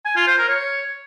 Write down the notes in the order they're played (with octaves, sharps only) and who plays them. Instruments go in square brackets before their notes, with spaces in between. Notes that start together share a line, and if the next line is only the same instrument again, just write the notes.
[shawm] G#5
F4
C5
A#4
C#5